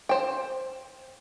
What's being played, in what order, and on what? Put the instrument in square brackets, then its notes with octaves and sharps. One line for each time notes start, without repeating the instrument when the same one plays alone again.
[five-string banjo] C5 G5